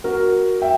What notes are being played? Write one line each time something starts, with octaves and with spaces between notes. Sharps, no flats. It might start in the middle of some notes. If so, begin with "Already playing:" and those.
F#4 A#4
E5 G5